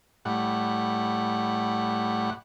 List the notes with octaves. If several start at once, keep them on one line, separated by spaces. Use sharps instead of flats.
A2 G3 F#5